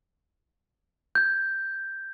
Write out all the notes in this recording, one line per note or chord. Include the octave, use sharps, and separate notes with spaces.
G6 G#6